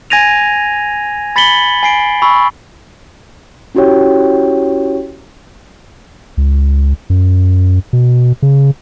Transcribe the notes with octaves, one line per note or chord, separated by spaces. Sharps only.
G#5 G#6 A#6 D#7 F7
B5 A6 B6 C#7 F#7 G7
G#5 C7 D7
B5 C#6 E6
C#4 E4 F#4 G4 C#5 G5
C#2
F#2
B2
C#3